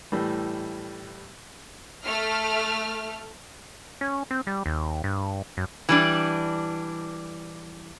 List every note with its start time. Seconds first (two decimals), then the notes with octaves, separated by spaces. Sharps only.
0.12 A2 E3 G3
2.05 A3 F6
4.01 C#4
4.31 C4
4.47 G3
4.66 D#2
5.04 G2
5.57 F#2
5.89 E3 G3 D4